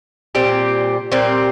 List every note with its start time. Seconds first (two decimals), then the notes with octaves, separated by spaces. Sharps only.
0.35 A#2 G3 C4 G4
1.12 A#2 G3 C4 G4